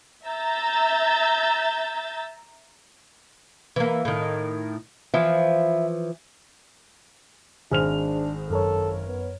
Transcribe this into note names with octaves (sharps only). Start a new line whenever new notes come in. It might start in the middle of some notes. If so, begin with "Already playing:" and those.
E5 A#5 E6 G6 A6
E3 A#3
A2 D#3
E3 F3 E5
G#1 D4 G#4 C5 F6 F7
F#2 A4 A#4 C#5
B3